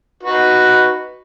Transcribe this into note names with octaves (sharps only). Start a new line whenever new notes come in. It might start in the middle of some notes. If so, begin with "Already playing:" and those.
D#4 F#4 B4